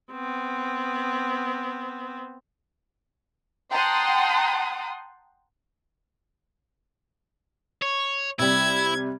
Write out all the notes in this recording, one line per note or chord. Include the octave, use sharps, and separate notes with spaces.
B3 C4
F#5 G5 A5 A#5 C6 D#6
C#5
C3 G3 E4 G#6